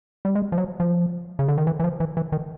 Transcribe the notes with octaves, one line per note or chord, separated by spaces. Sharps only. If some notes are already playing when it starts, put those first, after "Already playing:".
G3
G#3
F3
F#3
F3
C#3
D3
D#3
E3
E3
F3
E3
E3
D#3